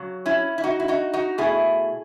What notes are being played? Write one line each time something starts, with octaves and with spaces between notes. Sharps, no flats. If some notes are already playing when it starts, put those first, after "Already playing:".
Already playing: C#3 F#3
C#4 E4
E4
D#4 F#4
E4
D#4 F#4
D#4 F#4
B2 A3 E4 G#4